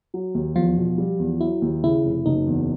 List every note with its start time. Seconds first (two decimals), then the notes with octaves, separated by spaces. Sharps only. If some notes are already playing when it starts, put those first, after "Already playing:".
0.14 F#3
0.34 D#2
0.56 E2 F3 F4
0.77 B2
0.98 G3
1.19 E2
1.41 F#3 E4
1.62 D#2
1.84 C#3 E4
2.04 F1
2.26 F#1 D#4
2.47 E2